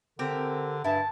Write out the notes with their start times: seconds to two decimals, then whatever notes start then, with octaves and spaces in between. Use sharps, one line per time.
0.19 D3 C4 G4 A#4
0.84 G2 E4 G#5 A5